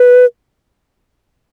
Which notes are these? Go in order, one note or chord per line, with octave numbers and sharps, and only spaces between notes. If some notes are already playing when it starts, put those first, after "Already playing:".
Already playing: B4